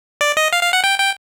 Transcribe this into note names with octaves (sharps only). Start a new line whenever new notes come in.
D5
D#5
F5
F5
F#5
G5
G5